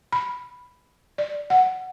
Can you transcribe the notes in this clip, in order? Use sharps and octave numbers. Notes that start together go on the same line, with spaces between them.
B5
D5
F#5